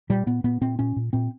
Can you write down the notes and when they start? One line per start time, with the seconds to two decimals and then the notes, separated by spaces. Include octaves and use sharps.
0.10 A#2 G3
0.26 A#2 B3
0.44 A#2 B3
0.61 A#2 C4
0.79 A#2 C#4
0.96 A#2
1.13 A#2 C4